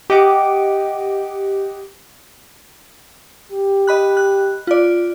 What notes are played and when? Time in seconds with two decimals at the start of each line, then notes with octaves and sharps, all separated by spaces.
0.10 G4 D#5 F#5 D6
3.52 G4
3.87 D#5 B5 F#6
4.17 F#6
4.67 F4 D5